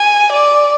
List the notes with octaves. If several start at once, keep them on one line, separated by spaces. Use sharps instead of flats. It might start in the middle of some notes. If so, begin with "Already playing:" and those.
Already playing: G#5
D5